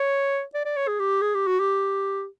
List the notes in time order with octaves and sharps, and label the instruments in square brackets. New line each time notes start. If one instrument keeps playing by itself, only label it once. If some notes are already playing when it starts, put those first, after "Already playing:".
Already playing: [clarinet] C#5
D5
D5
C#5
G#4
G4
G#4
G4
F#4
G4